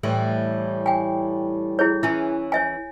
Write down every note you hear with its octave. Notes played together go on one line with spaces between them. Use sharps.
A2 E3 G3
G5 G#5
E4 G#4 C#5
E3 C#4 E4
C#5 E5 G#5